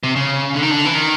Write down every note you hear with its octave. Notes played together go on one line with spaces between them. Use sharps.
C3
C#3
D3
D#3
D3
E3
D#3